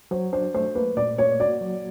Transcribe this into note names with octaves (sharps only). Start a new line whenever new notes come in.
F#3 C5
D4 C5
A3 C5
A#3 B4
A#2 D5
A#3 C#5
F#4 D5
F#3